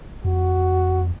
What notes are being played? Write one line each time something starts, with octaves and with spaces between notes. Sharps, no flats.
F2 F#4